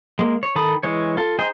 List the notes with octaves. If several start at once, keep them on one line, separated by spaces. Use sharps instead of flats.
G#3 A#3
C#5
D#3 A4 B5 D#6
E3 G#3 C#5
F4 A4
D#4 G#4 C5 D#5 G5